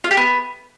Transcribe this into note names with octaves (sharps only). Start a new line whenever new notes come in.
F4
G4
B3